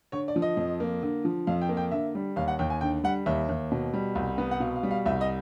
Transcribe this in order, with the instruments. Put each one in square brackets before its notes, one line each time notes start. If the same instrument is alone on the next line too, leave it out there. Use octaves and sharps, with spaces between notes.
[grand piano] D3 C#5
D5
F3
D#5
F2
A#3
D3
F3
F2 F5
G5
A#3
G5
D3 E5
G3
D#2 F5
F#5
D#2 G5
G#5
D3 G5
G3 F#5
D#2 E5
D#2
B2
G3
C2
B3
F#5
B2 F5
F5
G3
F5
C2 E5
D#5